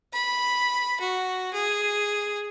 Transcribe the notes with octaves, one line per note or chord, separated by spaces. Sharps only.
B5
F#4
G#4